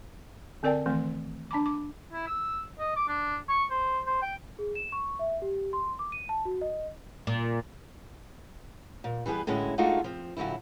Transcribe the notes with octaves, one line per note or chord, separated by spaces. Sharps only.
D3 C4 A#4 D5 G5 A5
D#3 E3 A3 C4
D4 A5 B5 D6
D6
E4
E6
D#5
D6
D4
C#6
C5
C5
G5
G#4
E7
C#6
E5
G4
C6
D6
D#7
A5
F#4
D#5
A#2
A#2
E3 G3 B3 G#4 B4
A2 D3 G#3 C#4 E4 F#4
G#3 A3 D4 D#4 F4 F#4
F3 C4
A#2 D3 F#3 G3 E4